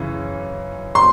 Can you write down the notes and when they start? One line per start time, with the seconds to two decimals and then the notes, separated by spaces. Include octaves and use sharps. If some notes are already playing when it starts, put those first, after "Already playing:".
Already playing: F#2 C#3 E3
0.95 C6